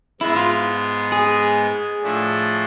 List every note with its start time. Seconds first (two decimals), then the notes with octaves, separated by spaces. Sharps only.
0.21 G#2 G#3 B3 E4
0.36 F4
1.12 G#4
2.03 A2 F3 A3 D4